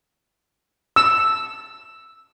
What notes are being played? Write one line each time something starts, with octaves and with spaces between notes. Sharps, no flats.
E6